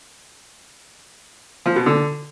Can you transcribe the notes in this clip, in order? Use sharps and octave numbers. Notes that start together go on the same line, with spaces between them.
F3
B2
D3